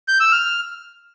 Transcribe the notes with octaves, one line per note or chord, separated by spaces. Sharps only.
G6
E6
F6